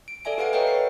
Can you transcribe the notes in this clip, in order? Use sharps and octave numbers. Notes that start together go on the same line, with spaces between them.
D7
A4 D5 E5 G#5 D7
G4 B4 F5 F#5 D7
A#4 B4 C#5 D#5 F5 G5
C7